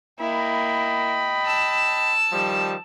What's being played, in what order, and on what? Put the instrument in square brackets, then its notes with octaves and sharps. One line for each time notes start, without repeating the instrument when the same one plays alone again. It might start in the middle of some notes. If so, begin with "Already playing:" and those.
[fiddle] A#3 E4 [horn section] D#5 G5 B5
[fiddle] A5 E6
[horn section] D#3 F3 G3